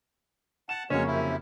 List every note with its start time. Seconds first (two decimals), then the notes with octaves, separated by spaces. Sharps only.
0.69 F#5 A5 E7
0.90 F2 C#3 F#3 G#3 A#3 C#4 C#5
1.07 F#2 C3 E4